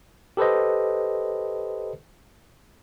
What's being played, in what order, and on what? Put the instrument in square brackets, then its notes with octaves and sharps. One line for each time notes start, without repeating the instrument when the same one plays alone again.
[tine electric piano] G4 A4 B4 C5 D#5